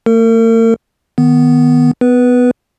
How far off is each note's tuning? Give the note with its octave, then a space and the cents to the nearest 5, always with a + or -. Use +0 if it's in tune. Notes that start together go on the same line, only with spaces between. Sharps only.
A3 +45 A#4 -40
D#3 +0 B3 +0
B3 +15 B4 -10